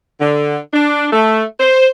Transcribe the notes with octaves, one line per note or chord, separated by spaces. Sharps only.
D3
D4
A3
C5